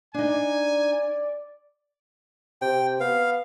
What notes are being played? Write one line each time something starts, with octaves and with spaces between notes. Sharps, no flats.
D4 D#4 D5 G#5
C3 G5
B3 F5